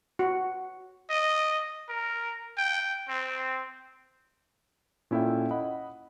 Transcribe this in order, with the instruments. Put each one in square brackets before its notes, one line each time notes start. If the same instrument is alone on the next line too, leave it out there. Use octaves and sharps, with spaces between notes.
[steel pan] F#4
[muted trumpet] D#5
A#4
G5
C4
[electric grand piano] A#2 C#4 E4 A4 E5 G5
D#5 F#5 B5